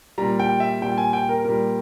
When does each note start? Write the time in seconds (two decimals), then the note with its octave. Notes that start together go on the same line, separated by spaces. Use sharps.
0.18 A#2 G3 A#5
0.40 G5
0.60 E5
0.81 A#2 G3 G5
0.98 G#5
1.13 G5
1.29 A#4
1.44 A#2 G3 A#4